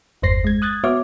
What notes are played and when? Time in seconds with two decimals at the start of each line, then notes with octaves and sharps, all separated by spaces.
0.22 G1 E2 G2 C5 A#6 C7
0.44 G#3 G#6
0.62 D#6 F#6 G#6 A6
0.84 B3 F#4 C#5 E5 D6 F6